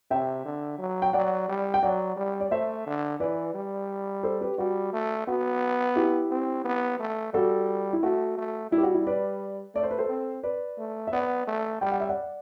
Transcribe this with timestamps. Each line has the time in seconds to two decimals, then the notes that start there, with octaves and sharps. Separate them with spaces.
0.11 C3 E5 G5
0.45 D3
0.79 F#3
1.02 G5
1.13 F#3 D5 F#5
1.48 G3
1.74 G5
1.83 F#3 D5 F#5
2.16 G3
2.40 D5
2.51 A3 C5 E5
2.87 D3
3.20 E3 B4 D5
3.54 G3
4.23 A4 C5
4.41 G4 B4
4.58 G3 F#4
4.93 A3
5.27 B3 F#4
5.96 E4 G4
6.31 C4
6.65 B3
7.00 A3
7.34 G3 F#4 A4
7.93 E4
8.03 A3 F#4
8.38 A3
8.72 G3 E4
8.78 G4
8.83 F#4
8.94 E4
9.07 B4 D5
9.75 A3 D5
9.83 C5
9.91 B4
9.98 A4 C5
10.09 C4
10.43 B4 D5
10.79 A3
11.07 E5
11.12 B3 D5 F#5
11.48 A3
11.81 G3 G5
11.91 F#5
12.01 E5
12.09 D5 F#5